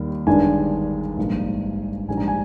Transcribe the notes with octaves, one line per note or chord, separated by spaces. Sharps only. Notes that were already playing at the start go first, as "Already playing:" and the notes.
Already playing: D#2 D#3 G3
G1 G2 D#3 G#3 D4 G#5
A#1 G#2 G3 A#3
A#1 G#2 G3 D4 G#5
A#5
G#5